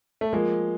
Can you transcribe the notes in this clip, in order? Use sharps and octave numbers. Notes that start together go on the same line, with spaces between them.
A3
F3 G#3 A#3